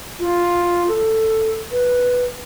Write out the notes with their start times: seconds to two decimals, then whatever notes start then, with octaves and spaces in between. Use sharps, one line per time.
0.19 F4
0.88 A4
1.71 B4